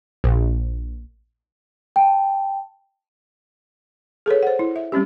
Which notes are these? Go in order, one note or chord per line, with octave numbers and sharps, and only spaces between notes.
A#1
G5 A5
G#4 A4 B4 C#5
C5 F#5
E4
E5
G3 C4 C#4 G4